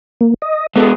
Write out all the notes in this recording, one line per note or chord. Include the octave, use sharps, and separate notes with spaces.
A#3
D#5
G#3 B3 A4